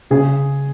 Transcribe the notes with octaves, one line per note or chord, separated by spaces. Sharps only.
C#3 G#4